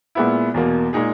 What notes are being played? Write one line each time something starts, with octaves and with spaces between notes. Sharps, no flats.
A#2 G#3 B3 E4
E2 B2 A#3
A#2 G#3 D#4 G#4